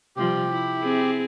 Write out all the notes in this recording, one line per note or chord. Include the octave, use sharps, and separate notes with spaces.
C3 F3 G3 G4
E4
C4 G#4